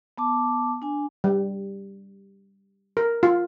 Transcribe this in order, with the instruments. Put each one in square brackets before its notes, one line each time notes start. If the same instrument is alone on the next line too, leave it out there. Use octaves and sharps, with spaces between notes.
[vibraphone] B3 A5 D6
D4 G#5
[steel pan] G3
A#4
F4